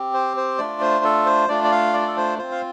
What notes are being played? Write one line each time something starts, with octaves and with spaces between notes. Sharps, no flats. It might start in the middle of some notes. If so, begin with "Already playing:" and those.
Already playing: C4 G4
C5
C5
A3 D4 F4 D5
C5
A4
C5
A3 D4 F4 D5
D5
F5
D5
A4
C5
C4 F4 C5
F5